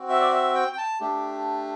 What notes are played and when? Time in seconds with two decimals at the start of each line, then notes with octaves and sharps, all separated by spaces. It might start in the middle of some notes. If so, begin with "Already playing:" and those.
Already playing: C4 F#4
0.09 E5
0.21 D5
0.32 E5
0.55 G5
0.73 G5
0.78 A5
1.00 A3 D4 G4